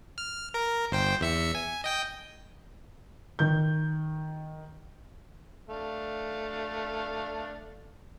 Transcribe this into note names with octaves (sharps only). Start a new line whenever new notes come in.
F6
A#4 A#5
G1 C5 G5
E2 E5 C#7
G#5
D#5 G5 G6
D#3 G6
A3 D4 F5